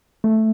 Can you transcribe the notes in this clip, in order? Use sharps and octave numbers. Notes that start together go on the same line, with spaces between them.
A3